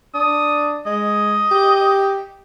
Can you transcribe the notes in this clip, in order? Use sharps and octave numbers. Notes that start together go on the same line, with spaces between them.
D4 D#6
G#3 D#5
G4